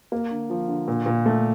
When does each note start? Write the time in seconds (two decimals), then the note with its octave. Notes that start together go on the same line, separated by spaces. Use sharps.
0.12 A#3
0.31 D3
0.50 F3
0.68 D3
0.88 A#2
1.06 A#2
1.26 A3